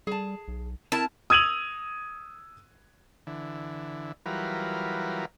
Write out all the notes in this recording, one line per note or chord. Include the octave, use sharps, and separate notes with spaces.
G3 G#4 A5
B1
C4 E4 A#4 A5
D#6 E6 G#6 D#7 F7 F#7
D3 E3
E3 F#3 G3 F4 A#4 B4